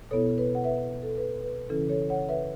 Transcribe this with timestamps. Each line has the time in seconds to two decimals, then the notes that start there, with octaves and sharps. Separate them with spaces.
0.11 B2 B3 E4 A4 C#5
0.38 B4
0.55 F#5
0.64 B4 E5
1.03 A4
1.17 B4
1.43 B4
1.69 C#3 E3 C#4 E4 A4
1.89 A4 C#5
2.10 C#5 F#5
2.29 B4 E5